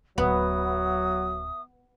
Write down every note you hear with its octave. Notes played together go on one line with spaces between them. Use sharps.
D1 F#3 B3 E5 D#6